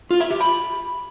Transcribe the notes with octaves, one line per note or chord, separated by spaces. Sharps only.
F4
E5
G4
B5